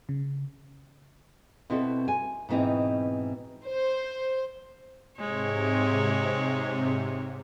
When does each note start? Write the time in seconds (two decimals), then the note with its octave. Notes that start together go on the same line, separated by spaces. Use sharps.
0.09 C#3
1.70 B2 C4 E4 F#4 A4
2.08 G#5
2.49 G#2 B2 E3 C4 D#4 E4
3.66 C5
5.19 G#2 C3 G#3 C#5